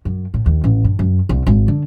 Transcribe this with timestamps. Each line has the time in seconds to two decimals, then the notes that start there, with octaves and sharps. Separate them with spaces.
0.05 F#2
0.34 A2
0.46 D#2
0.64 A1
0.84 G2
0.99 F#2
1.29 C2
1.46 G#1
1.68 D3